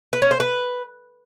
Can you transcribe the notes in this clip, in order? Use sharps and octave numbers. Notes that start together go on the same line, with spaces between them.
B4
C#4
C5
B4